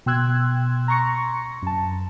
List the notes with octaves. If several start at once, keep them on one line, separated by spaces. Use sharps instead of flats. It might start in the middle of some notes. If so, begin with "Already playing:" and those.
B2 G5 C6 E6 F#6 G#6
A#5 C6 C#6 A#6 C#7
F#2 A5